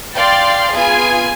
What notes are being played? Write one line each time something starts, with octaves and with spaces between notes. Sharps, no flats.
D5 F5 G5 C6 A6
B3 F4 G#4 G#5